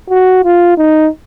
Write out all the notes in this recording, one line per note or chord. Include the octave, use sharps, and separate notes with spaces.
F#4
F4
D#4